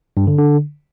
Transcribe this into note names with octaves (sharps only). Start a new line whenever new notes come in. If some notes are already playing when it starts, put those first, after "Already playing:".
G2
D3
D3